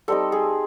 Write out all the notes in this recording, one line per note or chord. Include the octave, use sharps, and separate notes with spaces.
G3 C4 D#4 A4
G#4